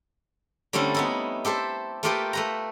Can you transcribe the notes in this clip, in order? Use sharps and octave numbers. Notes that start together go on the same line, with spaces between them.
D3 G3 A3 C4 C#4 E4
B3 D#4 E4
G4 A4 C5 E5
A3 A#3 F4 G4 B4 G5
A3 B4 A#5